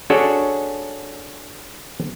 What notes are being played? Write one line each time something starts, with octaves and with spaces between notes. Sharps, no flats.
C#4 D4 F#4 G#4 A4 C#5